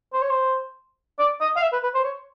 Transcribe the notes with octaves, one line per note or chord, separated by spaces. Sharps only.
C5
C#5
C5
D5
D#5
F5
E5
B4
B4
C5
C#5